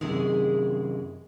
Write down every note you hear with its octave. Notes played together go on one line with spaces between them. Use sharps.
F#2 C3 D#3 G#3 E4 G#4